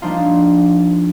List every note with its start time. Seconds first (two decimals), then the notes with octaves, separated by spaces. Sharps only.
0.02 F3 G3 A#3 D4 D#4 F4